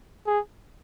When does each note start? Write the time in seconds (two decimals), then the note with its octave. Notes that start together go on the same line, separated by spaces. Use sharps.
0.27 G#4